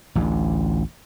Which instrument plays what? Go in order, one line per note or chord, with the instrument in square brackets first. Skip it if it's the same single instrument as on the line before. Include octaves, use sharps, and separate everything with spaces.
[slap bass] A1 D2